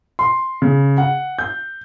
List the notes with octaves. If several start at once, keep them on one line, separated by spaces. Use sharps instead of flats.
C6
C#3
F#5
G6